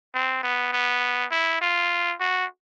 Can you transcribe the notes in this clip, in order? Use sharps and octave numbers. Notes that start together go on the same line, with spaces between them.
C4
B3
B3
E4
F4
F#4